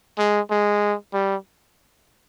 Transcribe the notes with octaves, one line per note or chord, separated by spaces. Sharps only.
G#3
G#3
G3